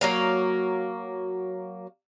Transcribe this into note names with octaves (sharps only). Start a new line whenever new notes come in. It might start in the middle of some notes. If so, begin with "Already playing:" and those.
F#3 A#3 F5